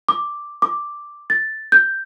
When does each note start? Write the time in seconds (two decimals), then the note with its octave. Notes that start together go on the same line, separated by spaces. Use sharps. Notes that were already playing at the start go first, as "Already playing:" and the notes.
0.09 D6
0.62 D6
1.30 A6
1.72 G6